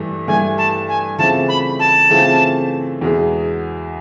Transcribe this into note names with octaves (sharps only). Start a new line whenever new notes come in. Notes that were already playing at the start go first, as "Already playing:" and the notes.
Already playing: G2 E3 A3
G2 E3 A3 G#5
A5
G#5
C#3 E3 A3 C4 F4 A5
B5
A5
C#3 E3 A3 C4 F4
E2 B2 G#3